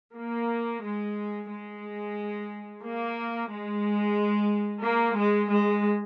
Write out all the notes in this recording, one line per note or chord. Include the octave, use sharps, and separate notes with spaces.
A#3
G#3
G#3
A#3
G#3
A#3
G#3
G#3